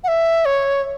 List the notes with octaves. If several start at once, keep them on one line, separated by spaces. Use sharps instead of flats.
F#5
E5
C#5